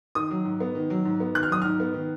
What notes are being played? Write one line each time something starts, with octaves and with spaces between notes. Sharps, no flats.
D#3 D#6
F#3
G#2
B3
D#3
F#3
G#2
B3
D#3 F#6
F6
F#3 D#6
G#2 F6
B3
D#3